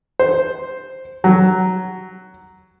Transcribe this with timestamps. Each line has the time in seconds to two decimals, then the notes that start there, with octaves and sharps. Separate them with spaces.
0.19 C5
1.24 F#3